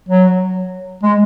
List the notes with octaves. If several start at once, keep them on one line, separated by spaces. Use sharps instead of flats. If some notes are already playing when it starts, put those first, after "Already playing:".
F#3
G#3